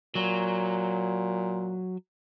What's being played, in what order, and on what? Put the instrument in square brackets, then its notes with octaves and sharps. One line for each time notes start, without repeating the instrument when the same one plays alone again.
[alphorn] A#2 [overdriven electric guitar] F#3